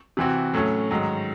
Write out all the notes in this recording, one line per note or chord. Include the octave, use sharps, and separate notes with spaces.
C3 E3 C4 F#4
A2 F#3 A3 C#4
G#2 D#3 F#3